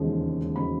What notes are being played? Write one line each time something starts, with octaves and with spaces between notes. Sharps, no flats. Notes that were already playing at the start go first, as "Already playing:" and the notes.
Already playing: E1 D#2 C#3 F3 G#3
C#3 F3 G#3 B5